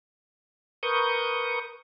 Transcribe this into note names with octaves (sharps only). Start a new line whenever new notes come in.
A#4 B4 C#6 D#6 G6